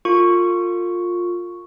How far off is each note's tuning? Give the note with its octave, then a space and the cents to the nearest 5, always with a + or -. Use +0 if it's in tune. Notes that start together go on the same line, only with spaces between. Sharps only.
F4 +15 A#4 -45 C#6 +0